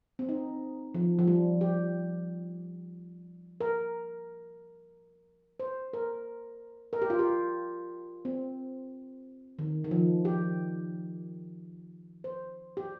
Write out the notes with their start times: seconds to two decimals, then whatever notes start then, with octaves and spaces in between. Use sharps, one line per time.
0.19 C4
0.29 D#4
0.94 F3
1.19 F3
1.28 G3
1.61 G4
3.61 A#4
5.60 C5
5.93 A#4
6.93 A#4
7.02 G4
7.10 F4
7.19 G4
8.25 C4
9.59 D#3
9.84 D#3
9.91 F3
10.25 G4
12.24 C5
12.77 G4